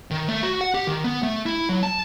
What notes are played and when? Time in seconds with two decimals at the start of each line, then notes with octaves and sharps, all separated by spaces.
0.11 D#3
0.28 A3
0.43 F#4
0.61 F#5
0.74 G4
0.87 D#3
1.04 B3
1.23 A3
1.46 E4
1.69 F#3
1.83 A5